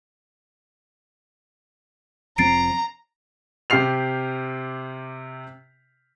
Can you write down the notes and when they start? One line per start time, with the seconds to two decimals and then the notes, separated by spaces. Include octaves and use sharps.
2.38 F1 F3 C4 A#5 A6 C7 D7
3.70 C3 G4 F6 C7 F7